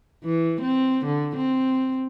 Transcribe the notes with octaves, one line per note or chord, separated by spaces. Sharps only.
E3
C4
D3
C4